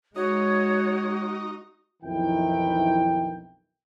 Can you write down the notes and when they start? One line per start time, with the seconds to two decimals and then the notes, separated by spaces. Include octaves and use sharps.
0.16 G#3 D#4 F#4 C#5
2.03 B1 F2 D#3 E3 E4 G5